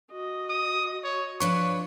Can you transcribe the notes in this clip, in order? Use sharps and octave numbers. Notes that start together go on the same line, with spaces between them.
F#4 D#5
D#6
C#5
F3 D4 B4 C#5 C#6